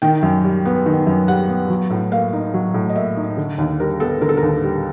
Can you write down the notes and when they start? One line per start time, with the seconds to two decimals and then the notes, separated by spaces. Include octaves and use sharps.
0.02 D#3 G5
0.22 F#2
0.44 G3
0.66 B3
0.86 D#3
1.07 F#2
1.28 G3 F#5
1.49 B3
1.70 F#3
1.90 A2
2.11 A#3 F5
2.33 D#4
2.54 F#3
2.74 A2
2.89 D#5
2.95 A#3 E5
3.17 D#4
3.37 D3
3.58 D#2
3.80 G3 A#4
4.00 B3 A4
4.21 D3 A#4
4.29 A4
4.37 A#4
4.42 D#2
4.63 G3